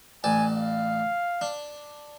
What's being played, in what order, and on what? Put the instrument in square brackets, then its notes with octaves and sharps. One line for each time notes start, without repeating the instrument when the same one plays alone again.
[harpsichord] A1 D5 A5 [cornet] G#5
[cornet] F5
[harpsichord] D4